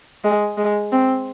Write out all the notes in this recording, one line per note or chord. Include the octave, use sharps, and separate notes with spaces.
G#3
G#3
C4